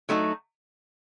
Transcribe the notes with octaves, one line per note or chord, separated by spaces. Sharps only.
F#3 A3 D#4 F#4